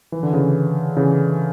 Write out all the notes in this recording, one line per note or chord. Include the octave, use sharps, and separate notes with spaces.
E3
D3
C#3 E3
C#3 E3